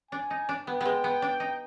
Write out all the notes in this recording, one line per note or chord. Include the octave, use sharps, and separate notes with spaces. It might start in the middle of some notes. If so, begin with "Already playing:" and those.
D4 G#5
D#4
D4
B3 G5
G#3 B3
B3
D4
D#4